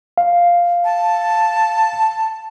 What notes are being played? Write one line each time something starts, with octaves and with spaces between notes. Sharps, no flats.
F5
A5